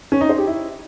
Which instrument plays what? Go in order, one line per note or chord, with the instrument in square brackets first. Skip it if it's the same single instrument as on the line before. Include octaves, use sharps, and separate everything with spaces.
[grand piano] C#4
D#4
C5
G4
E4